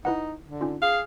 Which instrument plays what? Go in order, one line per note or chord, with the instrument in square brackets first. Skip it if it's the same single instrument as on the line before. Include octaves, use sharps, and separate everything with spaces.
[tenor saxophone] D#4 [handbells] E4 B4 F#5
[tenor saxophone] D3
[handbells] C#4 D#4 F4
[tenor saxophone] G#4 [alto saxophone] F5